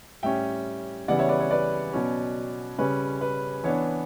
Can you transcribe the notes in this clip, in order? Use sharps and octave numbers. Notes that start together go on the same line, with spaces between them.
A2 G3 C#4 E5 G5
C#3 E3 G3 B3 D5 F#5
C#5 E5
B4 D5
C#5
B4 D5
B2 F#3 C#4
C#3 G3 C#4 B4
B4
E3 B3 D4 C#5